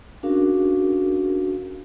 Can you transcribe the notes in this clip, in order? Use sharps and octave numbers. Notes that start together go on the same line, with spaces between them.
C#4 D4 F#4 G#4 A#4 F5